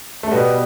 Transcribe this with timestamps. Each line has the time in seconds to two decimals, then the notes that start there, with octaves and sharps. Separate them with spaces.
0.23 A3
0.31 B2 G3 B3